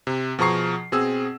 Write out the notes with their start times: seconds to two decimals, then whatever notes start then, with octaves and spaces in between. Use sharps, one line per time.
0.07 C3
0.39 B2 F3 G#4 A#5 C#6 C7
0.92 B2 C4 G#4 E6